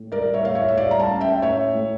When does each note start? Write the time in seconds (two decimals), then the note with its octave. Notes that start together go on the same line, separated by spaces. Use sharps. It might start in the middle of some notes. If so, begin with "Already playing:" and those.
Already playing: A2
0.12 G3 A#4 D5
0.34 C#5 E5
0.45 A2 F5
0.55 C#5 E5
0.68 E5
0.77 G3 D5 F5
0.91 A#5
0.99 F5 A5
1.10 C#4
1.21 E5 G5
1.42 A2 C#5 E5
1.75 A2